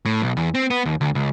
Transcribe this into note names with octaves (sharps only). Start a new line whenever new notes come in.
A2
B1
E2
C4
B3
D#2
D2
C#2